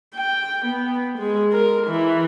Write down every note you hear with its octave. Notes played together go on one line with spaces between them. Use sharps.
G5
B3
G#3
A#4
E3